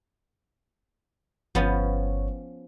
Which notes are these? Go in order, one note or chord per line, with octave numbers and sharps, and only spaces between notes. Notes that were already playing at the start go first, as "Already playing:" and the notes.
G1 F3 B3 C#4 C#5